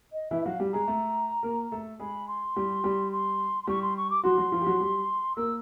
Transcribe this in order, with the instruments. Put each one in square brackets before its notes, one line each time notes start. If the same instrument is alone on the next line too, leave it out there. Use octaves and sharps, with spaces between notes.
[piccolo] D#5
[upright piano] E3 E4 [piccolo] E5
[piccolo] E5
[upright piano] F#3 F#4 [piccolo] F5
[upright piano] G3 G4
[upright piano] G#3 G#4 [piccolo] A#5
[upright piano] A3 A4
A#3 A#4
A3 A4
[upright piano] G#3 G#4 [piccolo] B5
[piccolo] C6
[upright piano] G3 G4
G3 G4
[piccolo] C6
C6
[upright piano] G3 G4 [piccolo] C#6
[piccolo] C6
C#6
D6
[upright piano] F#3 F#4 [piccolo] C6
[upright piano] F#3 F#4
F3 F4
G4
F#3 F#4
G3 G4
[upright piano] A#3 A#4 [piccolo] E6